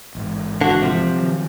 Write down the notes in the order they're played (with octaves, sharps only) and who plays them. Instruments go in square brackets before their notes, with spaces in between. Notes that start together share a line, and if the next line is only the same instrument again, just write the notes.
[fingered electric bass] A1 G#2
[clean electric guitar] D3 F#4
C3 F3
[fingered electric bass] D#3 F#3